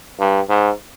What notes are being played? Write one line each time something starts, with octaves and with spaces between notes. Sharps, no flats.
G2
G#2